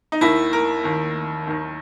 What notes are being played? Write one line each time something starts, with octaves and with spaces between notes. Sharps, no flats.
D#4
D#2 D#3 E4
A#4
D#2 D#3
D#2 D#3